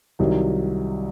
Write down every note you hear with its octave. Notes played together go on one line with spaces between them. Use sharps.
C2 C3 D#3 F#3